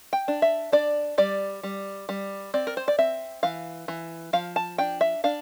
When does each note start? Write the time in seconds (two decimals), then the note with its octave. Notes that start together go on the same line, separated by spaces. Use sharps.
0.13 G5
0.28 D4
0.42 E5
0.72 D4 D5
1.18 G3 D5
1.63 G3
2.09 G3
2.54 C4 D5
2.67 A#4
2.77 C5
2.88 D5
2.98 C4 E5
3.43 E3 F5
3.88 E3
4.33 F3 F5
4.56 A5
4.78 D4 G5
5.01 E5
5.24 D4 F5